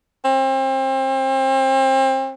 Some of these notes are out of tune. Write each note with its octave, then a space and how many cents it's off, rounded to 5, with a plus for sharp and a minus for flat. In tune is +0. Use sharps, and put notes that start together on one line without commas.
C4 +35